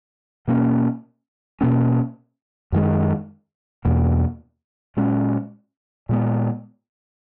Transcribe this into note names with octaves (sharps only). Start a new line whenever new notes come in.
B2 A#3 C#4
B2 A#3 C#4
F#2 D#3 G#3
E2 B2 A#3
A#2 G#3 C#4
A#2 G#3 B3